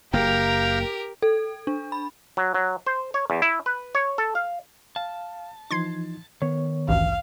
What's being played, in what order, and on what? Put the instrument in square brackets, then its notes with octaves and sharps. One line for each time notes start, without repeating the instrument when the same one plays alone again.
[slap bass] F#1 A#3 [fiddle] G4 A#4 [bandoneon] F5 G5 A#5
[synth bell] A4
D4
B5
[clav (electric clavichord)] F#3
F#3
C5
C#5
E2
E4
B4
C#5
A4
F5
[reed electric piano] F5 [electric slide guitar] A5
[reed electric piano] E3 F3 D#4 [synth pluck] C6 G#6 C7
[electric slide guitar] D#3 [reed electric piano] B3 C#5
[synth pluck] A1 D2 G2 [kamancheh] F5